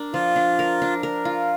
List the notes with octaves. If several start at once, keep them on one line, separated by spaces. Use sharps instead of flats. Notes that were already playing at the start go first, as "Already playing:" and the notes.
Already playing: D4 A#4
F3 F4
D4
A#4
D4
A#4
F4